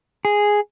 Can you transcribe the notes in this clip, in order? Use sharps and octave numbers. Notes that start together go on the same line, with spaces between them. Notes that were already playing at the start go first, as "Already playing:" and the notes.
G#4